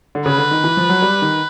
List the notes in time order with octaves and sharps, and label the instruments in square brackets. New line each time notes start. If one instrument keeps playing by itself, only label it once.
[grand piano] D3
[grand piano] C#3 [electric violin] B4
[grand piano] D3
D#3
E3
F3
F#3
G3
D#3